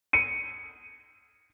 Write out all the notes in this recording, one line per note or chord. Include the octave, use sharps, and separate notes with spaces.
C#7 D#7